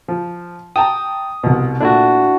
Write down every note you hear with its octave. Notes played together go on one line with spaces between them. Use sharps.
F3
G5 A5 A#5 D#6
C2 B2
A#2 A3 D4 E4 F#4